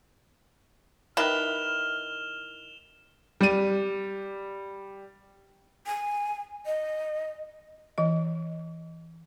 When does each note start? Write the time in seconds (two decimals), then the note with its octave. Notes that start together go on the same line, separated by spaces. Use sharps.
1.17 D#3 E4 B4 F6 E7 F7 G7
3.41 G3 D#7
5.86 G#5
6.66 D#5
7.98 E3 D#5